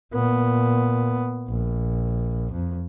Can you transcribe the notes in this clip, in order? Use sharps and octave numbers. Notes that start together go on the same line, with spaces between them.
A#2 B3
A#1
F2